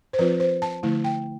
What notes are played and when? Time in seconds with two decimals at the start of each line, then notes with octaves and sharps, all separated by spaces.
0.13 C5
0.19 F3 C4 F4 B4
0.40 C5
0.62 A5
0.83 D3 F3 A3 E4
1.04 G5